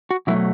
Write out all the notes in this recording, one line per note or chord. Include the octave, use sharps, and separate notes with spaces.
F#4
B2 F#3 A3 E4